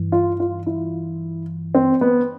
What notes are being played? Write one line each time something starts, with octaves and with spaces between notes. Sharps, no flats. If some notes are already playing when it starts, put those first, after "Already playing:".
Already playing: G2 E3
F4
F4
E4
C4
B3